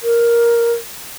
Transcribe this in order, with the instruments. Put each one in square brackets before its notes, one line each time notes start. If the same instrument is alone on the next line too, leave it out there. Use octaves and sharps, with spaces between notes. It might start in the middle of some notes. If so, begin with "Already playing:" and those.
[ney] A#4